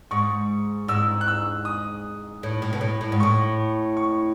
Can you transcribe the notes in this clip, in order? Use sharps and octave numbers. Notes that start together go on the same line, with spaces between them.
G#2 C#6
G#2 E6
F#6
E6
D#6
A2
A2
B2
A2
A2
G#2
A2 C#6
C#6